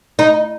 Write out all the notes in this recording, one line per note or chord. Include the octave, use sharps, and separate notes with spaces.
D#4